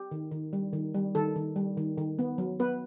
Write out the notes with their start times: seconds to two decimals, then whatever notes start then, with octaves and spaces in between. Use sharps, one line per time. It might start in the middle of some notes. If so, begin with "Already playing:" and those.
Already playing: G4
0.11 D#3
0.31 D#3
0.53 G3
0.73 D#3
0.94 G3
1.15 D#3 A4
1.36 D#3
1.56 G3
1.77 D#3
1.98 D#3
2.19 B3
2.38 F#3
2.60 B3 B4